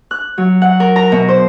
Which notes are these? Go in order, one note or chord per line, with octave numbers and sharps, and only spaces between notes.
F#6
F#3
F#5
A#4
A#5
B2
C5